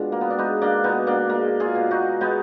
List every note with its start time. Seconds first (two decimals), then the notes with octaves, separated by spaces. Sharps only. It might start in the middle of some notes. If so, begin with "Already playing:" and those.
Already playing: B2 G#3 D4 F4
0.12 A#3
0.21 B3
0.30 D4
0.38 G#3 B3 D#4
0.62 A#3 D4
0.84 B2 B3 D#4
1.07 A#3 D4
1.29 G#3 A#3
1.60 F4 G#4
1.75 B2
1.91 D#4 F#4
2.21 G#3 B3 D#4